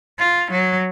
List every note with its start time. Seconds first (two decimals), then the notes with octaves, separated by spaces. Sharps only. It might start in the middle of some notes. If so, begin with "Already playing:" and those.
0.19 F4
0.51 F#3